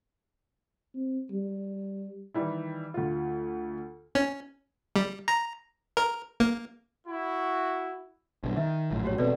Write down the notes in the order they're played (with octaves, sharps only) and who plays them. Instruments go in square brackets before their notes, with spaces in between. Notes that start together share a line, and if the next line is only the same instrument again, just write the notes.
[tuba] C4
G3
[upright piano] D#3 E3 G3 E4
D2 F4
[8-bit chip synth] C#4
G3
A#5
A#4
A#3
[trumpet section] E4 F#4
[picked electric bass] B1 G2
[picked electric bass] D#3 [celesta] E5
[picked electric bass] A#1 F#2 A2
[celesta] F#4 G4 C#5
[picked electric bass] E1 B2 C4 [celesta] A4 B4 D5